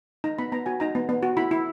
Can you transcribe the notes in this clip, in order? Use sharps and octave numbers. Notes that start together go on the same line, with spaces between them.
D#4 A#5
B3 B5
B3 A#5
F#4 G#5
D#4 A#5
B3
B3
F#4
E4 B5
E4